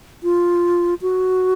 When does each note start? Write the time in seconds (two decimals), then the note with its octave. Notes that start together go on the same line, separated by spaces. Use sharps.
0.23 F4
1.02 F#4